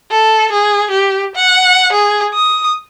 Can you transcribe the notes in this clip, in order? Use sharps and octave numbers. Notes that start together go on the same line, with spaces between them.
A4
G#4
G4
F#5
G#4
D#6